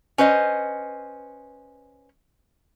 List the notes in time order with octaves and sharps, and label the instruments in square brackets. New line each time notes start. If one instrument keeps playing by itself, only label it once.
[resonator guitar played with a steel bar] C#4 B4 C5 D#5